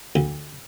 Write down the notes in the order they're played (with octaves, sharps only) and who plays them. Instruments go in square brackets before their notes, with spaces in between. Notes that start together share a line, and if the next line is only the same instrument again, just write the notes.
[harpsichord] D2